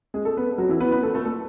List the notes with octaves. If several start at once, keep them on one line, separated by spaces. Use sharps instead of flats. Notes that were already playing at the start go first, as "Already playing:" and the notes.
G#3 G#4
A3 A4
B3 B4
F#3 F#4
E3 E4
B3 B4
B3 B4
A3 A4
A3 A4
A3 A4